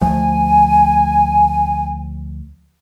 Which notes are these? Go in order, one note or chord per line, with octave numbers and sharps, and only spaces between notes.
D2 F3 A3 G#5